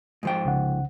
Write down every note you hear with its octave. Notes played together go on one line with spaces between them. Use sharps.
G#2 F3 G5
C2 C#3 F#5